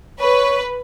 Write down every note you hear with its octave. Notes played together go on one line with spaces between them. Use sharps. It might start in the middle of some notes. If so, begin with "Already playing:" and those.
B4 C#5